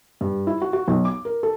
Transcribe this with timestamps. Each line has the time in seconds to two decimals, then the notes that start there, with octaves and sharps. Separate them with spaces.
0.21 G2
0.47 E4
0.62 F#4
0.73 F#4
0.88 B1
1.05 D6
1.25 A#4
1.43 A4